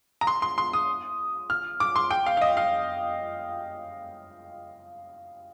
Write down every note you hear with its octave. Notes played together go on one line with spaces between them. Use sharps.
A#5
C6
C6
C6
D#6
F6
D6
C6
G5
F5
F5
D#5
F5